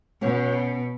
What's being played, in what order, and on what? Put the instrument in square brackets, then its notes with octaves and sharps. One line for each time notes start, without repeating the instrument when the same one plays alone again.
[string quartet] B2 [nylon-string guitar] C#4 F#4 C#5